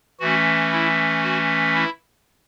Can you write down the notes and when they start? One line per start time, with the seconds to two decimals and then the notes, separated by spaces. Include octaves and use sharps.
0.20 E3 A3 C#4 F#4
0.72 E4
1.23 F#4
1.74 E4